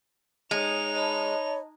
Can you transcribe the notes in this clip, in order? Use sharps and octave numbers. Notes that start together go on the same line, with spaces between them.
G#3 D#4 C#5 F7
C#5 D#5 A5 B5